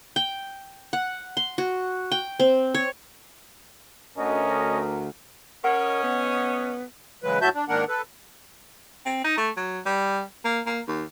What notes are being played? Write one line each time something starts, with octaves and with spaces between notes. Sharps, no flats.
G5
F#5
C6
F#4
G5
C4
C#5
D2 C#4 A#4 D#5
C#4 A#4 C#5 D#5 F#5
B3
C#3 E3 F#3 G#3 B4
A2 F#3 F#4 E5 A5 G6
D4
G#2 D#3 A#3 D4 A#4 F#5
A4 B4
C4
D#4
A3
F#3
G3
A#3
A#3
D#2